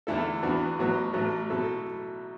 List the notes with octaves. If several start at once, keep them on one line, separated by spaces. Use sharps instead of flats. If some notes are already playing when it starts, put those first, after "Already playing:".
E2 D3 A3 E4 A4
E2 E3 B3 D4 F#4
A1 A2 F#3 B3
A1 A2 F#3 A3
B2 F#3 A3 E4 A4